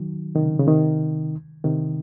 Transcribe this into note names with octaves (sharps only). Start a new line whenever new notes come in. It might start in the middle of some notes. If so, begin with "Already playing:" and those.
Already playing: D#3 F#3
C3 D#3
C#3
C#3
C3 D#3
C3 D#3